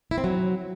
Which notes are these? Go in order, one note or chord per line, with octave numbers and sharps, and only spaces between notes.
E4
C4
F#3